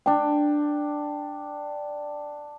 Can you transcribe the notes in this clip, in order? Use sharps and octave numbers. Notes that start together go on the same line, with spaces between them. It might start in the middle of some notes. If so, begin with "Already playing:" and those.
D4 G5